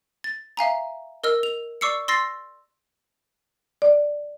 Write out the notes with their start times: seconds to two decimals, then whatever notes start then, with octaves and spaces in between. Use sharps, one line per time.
0.24 A6
0.57 E5 F5 G#5 A#5
1.24 A#4 D#5 E6 F6
1.43 F7
1.81 D5 C#6 D6 E6 C7 C#7
2.08 C6 E6 A6 A#6 C7
3.82 D5